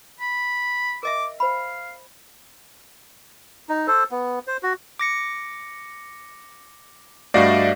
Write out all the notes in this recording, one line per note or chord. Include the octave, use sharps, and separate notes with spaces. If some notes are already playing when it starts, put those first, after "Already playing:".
B5
A#4 D#5 E5 D6
C5 F5 B5
D#4
A4 C5
B3
C5
F#4
D6 A#6 C#7
G2 A3 F#4 D5 D#5 F5